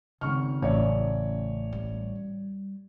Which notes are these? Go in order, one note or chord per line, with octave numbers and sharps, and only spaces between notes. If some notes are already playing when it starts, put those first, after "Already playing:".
G#1 C#3 C#6 F6
A1 C#5 D5
G3